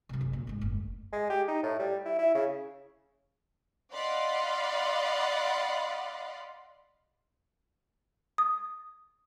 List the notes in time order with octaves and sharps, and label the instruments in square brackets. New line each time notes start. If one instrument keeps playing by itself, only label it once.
[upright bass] C3 F#3
F#1 C#3
A#2
A1 G#2
F#1 D2
[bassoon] G#3
G4
D#4
A2
G3
E4
E4
C#3
[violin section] D5 D#5 F5 F#5 B5 C6
[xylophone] D#6